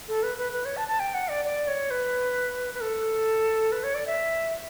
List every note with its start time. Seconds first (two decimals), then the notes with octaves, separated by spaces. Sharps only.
0.09 A4
0.23 B4
0.38 B4
0.53 B4
0.65 C#5
0.77 A5
0.88 A5
1.00 G5
1.14 F#5
1.29 D5
1.45 D5
1.68 C#5
1.91 B4
2.74 B4
2.81 A4
3.72 B4
3.84 C#5
3.95 D5
4.07 E5